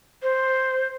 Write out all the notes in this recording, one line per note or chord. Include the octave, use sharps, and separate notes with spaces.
C5